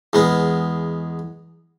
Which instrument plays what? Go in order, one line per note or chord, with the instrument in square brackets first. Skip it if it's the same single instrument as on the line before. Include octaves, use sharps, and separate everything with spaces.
[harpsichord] E2 G#3 B3